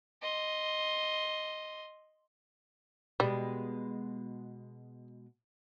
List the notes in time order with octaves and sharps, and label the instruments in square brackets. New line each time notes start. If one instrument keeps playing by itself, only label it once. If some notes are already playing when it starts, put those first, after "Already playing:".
[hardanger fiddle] D#5 C6
[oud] B2 G#3 [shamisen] G3